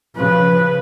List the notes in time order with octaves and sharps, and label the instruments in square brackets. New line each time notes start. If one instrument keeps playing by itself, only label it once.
[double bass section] C#3 F3 [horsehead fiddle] B4